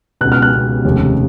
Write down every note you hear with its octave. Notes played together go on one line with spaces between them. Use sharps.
C#2 B2 F#6
F6
F#6
C#2 B2
F1 D#2 C#3